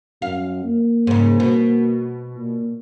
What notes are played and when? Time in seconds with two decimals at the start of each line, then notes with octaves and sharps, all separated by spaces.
0.22 F#2 F5
0.64 A#3
1.07 G#2 C#3
1.40 B2
2.36 A#2